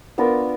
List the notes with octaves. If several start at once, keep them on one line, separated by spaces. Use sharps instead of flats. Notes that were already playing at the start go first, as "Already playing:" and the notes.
B3 D4 F4 A#4